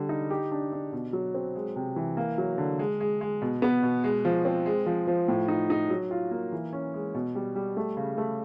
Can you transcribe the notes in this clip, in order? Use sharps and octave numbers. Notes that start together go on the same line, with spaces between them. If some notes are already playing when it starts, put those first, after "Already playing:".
Already playing: D3 G3
D#4
G4
D4
D4
B2
F#3
C4
G#3
C3
E3
A#3
F#3
D3
G#3
G#3
G#3
B2
B3
B2
G#3
F3
C4
G#3
F3
F3
A2
D#4
D#4
F#3
F4
A#3
E3
C#4
G#3
B2
G3
G3
A3
C#3
A3